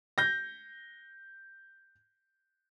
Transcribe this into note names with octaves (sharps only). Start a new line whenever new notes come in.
G6 A#6